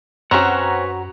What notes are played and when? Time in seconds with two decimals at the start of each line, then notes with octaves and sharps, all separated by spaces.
0.31 F#2 C4 C#4 F#4 B4 C#5 F#5 A#5